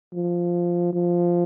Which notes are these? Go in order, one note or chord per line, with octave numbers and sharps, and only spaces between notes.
F3
F3